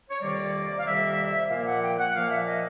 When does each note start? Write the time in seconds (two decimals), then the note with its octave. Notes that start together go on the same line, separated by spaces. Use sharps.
0.10 C#5
0.21 F2 C3 D#3 G3 A#3 D5
0.79 F5
0.85 F2 C3 D#3 G3 A#3 E5
1.50 A#2 F3 A#3 F5
1.67 F#5
1.82 G5
1.99 F#5
2.14 A#2 F3 A#3 F5
2.30 E5
2.47 D#5